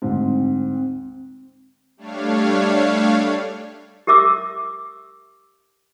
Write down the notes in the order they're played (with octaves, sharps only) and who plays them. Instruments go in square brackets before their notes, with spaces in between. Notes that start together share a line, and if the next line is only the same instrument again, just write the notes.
[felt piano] D2 G#2 [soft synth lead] C4
[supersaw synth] G3 A3 D4 C#5 F5
[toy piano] G4 A#4 E5 D6 E6